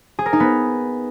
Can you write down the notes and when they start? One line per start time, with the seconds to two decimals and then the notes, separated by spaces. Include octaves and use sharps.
0.19 G#4
0.26 A#4
0.33 D#4
0.40 B3